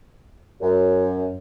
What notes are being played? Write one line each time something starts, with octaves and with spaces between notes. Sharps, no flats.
F#2